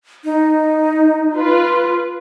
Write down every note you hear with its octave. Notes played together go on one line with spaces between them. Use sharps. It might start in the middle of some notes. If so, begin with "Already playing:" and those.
D#4
F4 B4